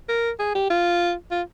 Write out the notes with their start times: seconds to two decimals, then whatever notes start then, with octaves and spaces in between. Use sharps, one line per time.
0.09 A#4
0.39 G#4
0.55 G4
0.70 F4
1.31 F4